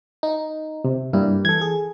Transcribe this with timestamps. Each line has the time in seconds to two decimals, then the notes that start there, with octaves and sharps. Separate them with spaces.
0.23 D#4
0.84 C3
1.13 G2 G3 A#3 E4
1.45 E3 A4 G#6
1.61 G#4